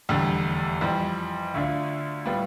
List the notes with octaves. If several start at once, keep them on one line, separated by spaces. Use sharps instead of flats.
F1 E2 D3 G3
F2 E3 G3
D2 D3 A3 D4 F4
A2 G3 B3 F4